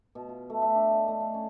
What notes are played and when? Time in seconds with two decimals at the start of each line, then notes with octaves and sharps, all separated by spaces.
0.15 B2
0.29 F4
0.50 A3
0.62 E5
0.75 D4
0.91 D#5
1.08 A3
1.20 F5
1.34 C#4